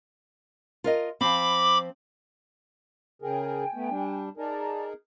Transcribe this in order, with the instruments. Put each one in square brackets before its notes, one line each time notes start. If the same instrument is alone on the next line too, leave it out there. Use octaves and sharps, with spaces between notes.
[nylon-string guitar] F4 A#4 D#5
[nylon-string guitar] F3 C4 [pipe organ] B5 D6
[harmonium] C#3 G#4 A#4 [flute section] G5 G#5
[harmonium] A3 B3
G3 D4
[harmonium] D#4 G#4 A#4 [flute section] D5 A5 A#5